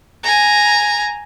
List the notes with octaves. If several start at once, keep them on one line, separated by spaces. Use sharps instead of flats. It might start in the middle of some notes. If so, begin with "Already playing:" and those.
G#5 A#5